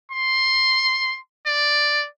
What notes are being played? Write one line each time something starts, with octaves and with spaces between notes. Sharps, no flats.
C6
D5